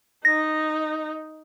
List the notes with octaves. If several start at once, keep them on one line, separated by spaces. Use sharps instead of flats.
D#4 A#6